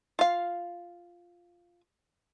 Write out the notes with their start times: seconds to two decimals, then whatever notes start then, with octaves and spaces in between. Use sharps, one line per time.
0.19 F4 F5